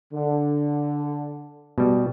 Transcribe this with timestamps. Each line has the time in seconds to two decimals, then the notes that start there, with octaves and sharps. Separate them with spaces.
0.13 D3
1.78 B2 G3